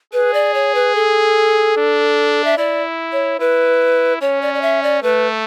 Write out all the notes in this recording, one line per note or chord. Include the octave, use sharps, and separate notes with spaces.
G#4 B4
D5
C#5
B4
A4
D4
E5
E4 D5
C#5
E4 B4
C#4 C#5
D5
D5
E5
D5
A3 B4